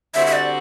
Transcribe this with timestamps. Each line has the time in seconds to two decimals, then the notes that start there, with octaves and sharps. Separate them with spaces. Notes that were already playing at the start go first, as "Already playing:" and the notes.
0.14 D3 G3 C4 F#4 E5
0.27 E5
0.33 D5